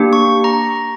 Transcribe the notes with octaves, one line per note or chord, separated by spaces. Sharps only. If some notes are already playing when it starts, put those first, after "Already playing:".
Already playing: A#3 D4 G4
C#6
A#5